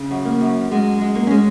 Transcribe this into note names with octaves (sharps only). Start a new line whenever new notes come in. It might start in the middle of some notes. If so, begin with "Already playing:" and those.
Already playing: C#3
F#2
A#3
F#2
F#2 G#3
G#3
A#3
G#3 C#4